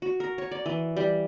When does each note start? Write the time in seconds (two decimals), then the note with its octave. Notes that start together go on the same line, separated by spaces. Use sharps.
0.02 F#4
0.20 A#4
0.38 C#5
0.51 D5
0.66 E3
0.97 G3